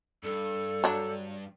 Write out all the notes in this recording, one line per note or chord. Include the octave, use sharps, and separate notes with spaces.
G2 A4
F#3 D4